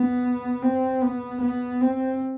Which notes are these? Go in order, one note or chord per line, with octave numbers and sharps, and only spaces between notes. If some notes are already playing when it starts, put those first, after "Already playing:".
Already playing: B3
C4
B3
B3
C4